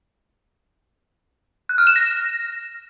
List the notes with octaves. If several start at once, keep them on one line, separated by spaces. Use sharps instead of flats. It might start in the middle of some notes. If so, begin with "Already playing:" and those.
F#6
F6
E7
A#6